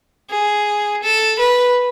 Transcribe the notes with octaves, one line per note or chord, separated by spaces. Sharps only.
G#4
A4
B4